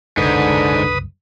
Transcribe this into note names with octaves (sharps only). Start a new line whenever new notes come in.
F#1 C2 G#2 D3 B4 D#6